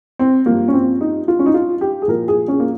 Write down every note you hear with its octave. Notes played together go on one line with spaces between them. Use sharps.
C4
G2 F3 A#3
C#4
C4
D#4
F4
C#4
D#4
F4
G4
G#4
A#2 F3 A#4
G#4
C#4
A#3